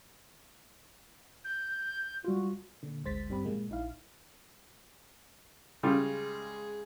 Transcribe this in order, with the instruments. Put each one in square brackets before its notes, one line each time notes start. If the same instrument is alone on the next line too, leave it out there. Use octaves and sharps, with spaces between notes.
[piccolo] G6
[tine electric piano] G3 F4 [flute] F#4
[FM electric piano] A#2 D3
G#1 D2 G#3 C5 A6 B6
G2 G3 C4 G4 B5
A#2 F3 G#3 A#3
A#1 D#4 E4 F5
[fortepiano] C#3 G3 F4 [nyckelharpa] G#3 G#4